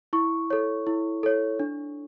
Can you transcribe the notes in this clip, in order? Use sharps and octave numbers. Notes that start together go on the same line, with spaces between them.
E4 C#6
A4 C#5
E4
A4 C#5
D4